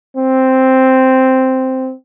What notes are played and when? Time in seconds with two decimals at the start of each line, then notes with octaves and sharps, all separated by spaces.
0.17 C4